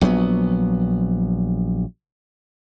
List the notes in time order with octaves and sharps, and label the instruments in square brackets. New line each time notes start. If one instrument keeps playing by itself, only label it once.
[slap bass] A#1 F#3 B3